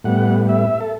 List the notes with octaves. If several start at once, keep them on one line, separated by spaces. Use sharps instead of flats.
A2 G3 B3 F#5
E5
A4